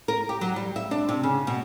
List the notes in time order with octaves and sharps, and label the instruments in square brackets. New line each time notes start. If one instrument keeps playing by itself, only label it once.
[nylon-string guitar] A#4
G4
F#3
G3
E5
D4
C3
C#3
B2